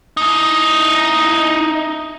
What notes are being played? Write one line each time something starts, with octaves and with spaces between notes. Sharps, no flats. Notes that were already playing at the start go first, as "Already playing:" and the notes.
D#4 E4